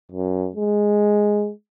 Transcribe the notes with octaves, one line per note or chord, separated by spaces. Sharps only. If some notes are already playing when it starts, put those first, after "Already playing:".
F#2
G#3